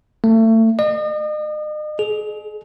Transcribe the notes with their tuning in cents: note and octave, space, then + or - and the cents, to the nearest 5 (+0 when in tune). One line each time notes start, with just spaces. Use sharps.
A3 +30
D#5 -40
G#4 +35